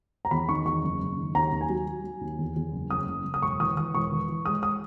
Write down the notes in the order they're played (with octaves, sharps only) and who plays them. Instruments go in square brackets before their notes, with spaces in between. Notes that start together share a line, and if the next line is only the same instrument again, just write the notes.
[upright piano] A#5
E2 B5
D#3 C#6
E2 C#6
F#1
F#1
D#3
D#2 A#5
D#2
G#5
F#3
F#3
F#3
D#2
E2
E2
F#1
F#1 D#6
F#1
F#1
D#6
E1 C#6
E3 D#6
E3 D#6
E1 C#6
E3
E3
G#3 D#6
D#6